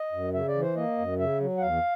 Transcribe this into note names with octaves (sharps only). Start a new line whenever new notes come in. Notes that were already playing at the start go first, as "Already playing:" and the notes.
Already playing: D#5
F#2
C#3 E5
D5
E3
C5
A#3 D#5
F#2
C#3 E5
F#3
F#5
E2 F5